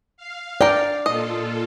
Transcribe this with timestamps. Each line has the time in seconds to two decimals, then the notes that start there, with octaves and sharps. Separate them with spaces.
0.17 F5
0.61 A#4 D5 G5
1.06 A#2 F4 A4 D#5